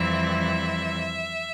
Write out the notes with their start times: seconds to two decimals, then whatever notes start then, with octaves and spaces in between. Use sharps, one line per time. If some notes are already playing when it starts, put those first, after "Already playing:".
Already playing: F2 E3 G3 C4 E4 E5
0.43 E5